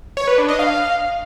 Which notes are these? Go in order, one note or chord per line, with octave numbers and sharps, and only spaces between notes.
C#5
B4
D4
D#5
F5